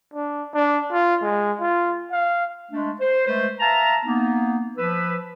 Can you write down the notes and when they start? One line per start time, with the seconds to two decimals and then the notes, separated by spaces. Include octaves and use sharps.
0.14 D4
0.54 D4
0.91 F4
1.22 G#3
1.60 F4
2.11 F5
2.72 G#3 A3 D4
3.01 C5
3.26 G#3 A3 B4 C5
3.60 E5 F5 A5 A#5
4.05 A#3 B3 D#4
4.78 F3 B4 E6